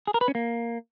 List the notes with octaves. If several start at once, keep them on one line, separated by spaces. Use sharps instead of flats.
G#4
A#4
B4
C#4
A#3